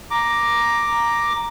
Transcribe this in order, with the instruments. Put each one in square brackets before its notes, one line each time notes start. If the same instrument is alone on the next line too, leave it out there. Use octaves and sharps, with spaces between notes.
[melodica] A#5 D6